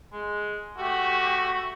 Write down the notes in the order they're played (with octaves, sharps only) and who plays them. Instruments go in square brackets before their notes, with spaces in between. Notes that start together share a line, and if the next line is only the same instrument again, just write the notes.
[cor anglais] G#3
[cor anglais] A3 [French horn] F#4 [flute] G4